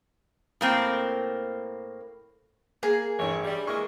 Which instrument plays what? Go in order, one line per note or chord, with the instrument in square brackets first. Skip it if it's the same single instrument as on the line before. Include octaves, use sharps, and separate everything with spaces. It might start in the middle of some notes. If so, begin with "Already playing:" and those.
[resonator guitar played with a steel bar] A2 A#3 C4
[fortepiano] A#3 [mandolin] G#4
[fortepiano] A1 G2 [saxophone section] C#5
[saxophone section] G3
[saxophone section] E3 G#3 A#3 [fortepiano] C#6